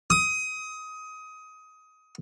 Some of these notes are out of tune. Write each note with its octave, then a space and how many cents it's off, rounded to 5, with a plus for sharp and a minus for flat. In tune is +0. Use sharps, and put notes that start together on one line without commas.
D#6 +20